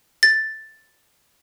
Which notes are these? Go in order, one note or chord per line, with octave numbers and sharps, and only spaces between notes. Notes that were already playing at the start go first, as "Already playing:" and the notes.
A6